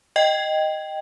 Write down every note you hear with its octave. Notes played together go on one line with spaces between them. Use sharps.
D#5 G5